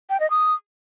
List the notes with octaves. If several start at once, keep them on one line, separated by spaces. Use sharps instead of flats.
G5
D#5
D#6